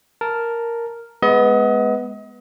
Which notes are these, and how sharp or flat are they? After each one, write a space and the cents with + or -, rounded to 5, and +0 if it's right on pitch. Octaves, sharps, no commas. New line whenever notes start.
A#4 +0 A5 +0
G#3 +0 B3 +0 D#5 +35